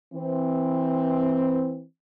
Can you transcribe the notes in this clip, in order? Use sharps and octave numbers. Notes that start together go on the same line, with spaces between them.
E3 C4